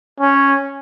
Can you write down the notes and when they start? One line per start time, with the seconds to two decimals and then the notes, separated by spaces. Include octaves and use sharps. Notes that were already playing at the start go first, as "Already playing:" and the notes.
0.20 C#4